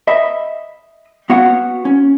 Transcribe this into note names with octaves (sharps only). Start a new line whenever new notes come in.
D#5 E5 B5
B3 F#4 C#5 F5 F#5
C#4